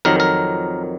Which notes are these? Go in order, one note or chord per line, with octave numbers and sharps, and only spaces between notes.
F2 D#3 F#3 A#4
A#4